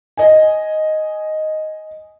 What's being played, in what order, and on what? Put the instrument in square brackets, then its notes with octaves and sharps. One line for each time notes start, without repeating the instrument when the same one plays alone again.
[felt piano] D#5 G#5